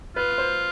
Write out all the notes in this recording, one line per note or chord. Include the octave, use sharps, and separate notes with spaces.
F4 B4
C5